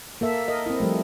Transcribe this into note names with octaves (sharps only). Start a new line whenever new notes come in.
A#3 A4 E5
A#4 D#5
C4 E4
F3 G3 A3